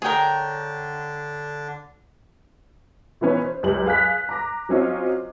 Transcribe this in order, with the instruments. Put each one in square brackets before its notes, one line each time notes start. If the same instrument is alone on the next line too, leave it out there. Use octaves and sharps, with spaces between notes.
[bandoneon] D3 D4 [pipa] G#4 A#4 [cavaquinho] C#5 G5
[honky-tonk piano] E3 F3 B3 C#4 D#4
C5
C#2 F#2 G4 F#7
G#4 F5 F#6 B6
A#5 D6 A#6
F#3 C4 C#4 F4 D#5